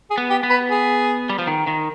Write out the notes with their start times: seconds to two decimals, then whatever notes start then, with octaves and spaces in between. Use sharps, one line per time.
0.10 G#4
0.18 B3
0.30 G4
0.43 B3
0.50 B4
0.70 G#4
1.30 G3
1.39 F3
1.47 D#3
1.67 D#3